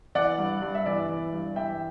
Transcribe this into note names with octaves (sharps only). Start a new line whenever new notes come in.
E3 D5 F#5
G2
G2
E5
E3 D5
E3
G2
E3 E5 G5